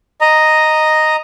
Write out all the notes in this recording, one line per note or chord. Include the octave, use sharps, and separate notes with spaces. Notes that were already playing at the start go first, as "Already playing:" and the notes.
D#5 A#5